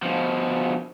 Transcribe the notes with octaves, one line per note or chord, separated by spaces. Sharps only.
B2 F3